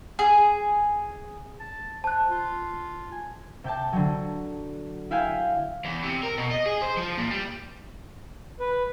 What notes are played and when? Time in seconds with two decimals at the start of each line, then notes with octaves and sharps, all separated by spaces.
0.19 G#4
1.60 A5
2.04 C5 A5 F#6
2.29 F4
3.12 G#5
3.64 C3 G5 A5
3.93 D3 F#3
5.11 E4 E5 F5 G5 G#5
5.85 E2
6.04 C3
6.23 A#4
6.38 B2
6.51 D#5
6.66 G#4
6.82 C5
6.97 F3
7.18 A#2
7.31 G3
8.60 B4